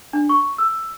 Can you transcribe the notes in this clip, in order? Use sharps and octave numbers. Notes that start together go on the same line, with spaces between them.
D4
C#6
E6